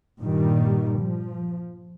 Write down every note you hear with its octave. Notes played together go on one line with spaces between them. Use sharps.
G2 A#2 D#3 G3
F3